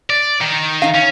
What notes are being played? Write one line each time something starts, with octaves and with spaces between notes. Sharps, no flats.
D5
D#3
D#4 F5
C#4